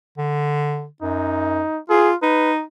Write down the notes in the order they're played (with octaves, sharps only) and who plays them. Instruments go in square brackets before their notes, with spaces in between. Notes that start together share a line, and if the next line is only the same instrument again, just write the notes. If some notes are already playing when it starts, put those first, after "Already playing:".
[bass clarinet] D3
[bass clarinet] F#2 [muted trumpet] D#4
[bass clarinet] F4 [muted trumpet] G#4
[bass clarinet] D#4 [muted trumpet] B4